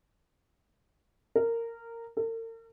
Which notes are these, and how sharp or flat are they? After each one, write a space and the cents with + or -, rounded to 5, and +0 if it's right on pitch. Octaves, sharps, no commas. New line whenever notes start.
A#4 -15
A#4 -45